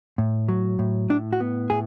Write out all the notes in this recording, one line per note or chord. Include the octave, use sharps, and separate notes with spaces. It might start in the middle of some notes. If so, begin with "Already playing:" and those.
A2
F#3
A2
A2 D4
F#4
B3
A2 G#4